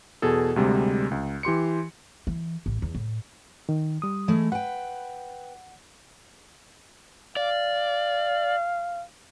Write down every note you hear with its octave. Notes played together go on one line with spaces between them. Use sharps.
E2 B2 G#4 A4
D2 C3 G3 G#3
C#2
E3 G4 C6 C#7
E3
A1
E2
A2
D#3
G3 D#6
E3 G#3 A3
B4 F#5 G5
D5 F5